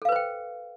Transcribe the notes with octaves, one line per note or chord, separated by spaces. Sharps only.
A4 B4 C5 F5 G5